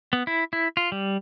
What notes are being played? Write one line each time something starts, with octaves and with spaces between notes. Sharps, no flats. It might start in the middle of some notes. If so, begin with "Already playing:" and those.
B3
E4
E4
F4
G3